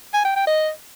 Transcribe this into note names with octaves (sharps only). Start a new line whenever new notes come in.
G#5
G5
G5
D#5